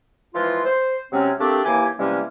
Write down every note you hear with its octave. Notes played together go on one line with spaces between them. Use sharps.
E3 F3 G#3 F4
C5
C3 F#3 G#3 C4 C#4
A3 A#3 C4 D4 G4
D#2 E3 A#3 G4 G#5
C3 E3 G3 G#3 A#3 C#4